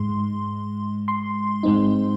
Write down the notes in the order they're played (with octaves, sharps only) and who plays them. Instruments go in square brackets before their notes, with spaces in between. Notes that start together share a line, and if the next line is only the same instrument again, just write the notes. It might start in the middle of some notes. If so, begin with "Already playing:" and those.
Already playing: [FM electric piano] G#2 G#3 C6
C6
G#2 G#3 C4 D#4